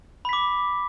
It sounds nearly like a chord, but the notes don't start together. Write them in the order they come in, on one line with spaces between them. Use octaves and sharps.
B5 B6 D6